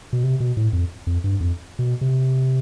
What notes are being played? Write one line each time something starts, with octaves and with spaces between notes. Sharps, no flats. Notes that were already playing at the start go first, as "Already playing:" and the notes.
B2
C3
B2
A2
F2
F2
G2
F2
B2
C3